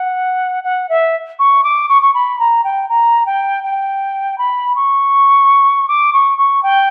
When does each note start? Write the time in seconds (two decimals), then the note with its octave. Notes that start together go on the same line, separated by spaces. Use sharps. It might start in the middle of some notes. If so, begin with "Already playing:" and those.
Already playing: F#5
0.64 F#5
0.89 E5
1.39 C#6
1.64 D6
1.89 C#6
2.02 C#6
2.14 B5
2.39 A#5
2.64 G5
2.89 A#5
3.26 G5
3.64 G5
4.38 B5
4.76 C#6
5.88 D6
6.13 C#6
6.38 C#6
6.63 G5